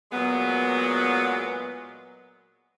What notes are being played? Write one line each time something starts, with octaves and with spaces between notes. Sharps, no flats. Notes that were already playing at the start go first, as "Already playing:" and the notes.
A#2 F#3 G#3 B3